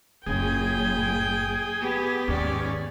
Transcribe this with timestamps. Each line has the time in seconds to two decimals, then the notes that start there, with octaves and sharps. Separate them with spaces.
0.26 F#1 F#2 A#2 C#4 G#4 G5
1.80 B3 G4
2.28 D#2 G#2 C#4 D5